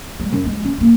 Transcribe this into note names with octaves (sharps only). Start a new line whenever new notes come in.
G3 G#3
F#2 E4
F3 G#3
C#4
A#3 E4